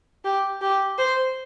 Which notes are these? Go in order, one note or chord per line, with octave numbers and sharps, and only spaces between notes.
G4
G4
C5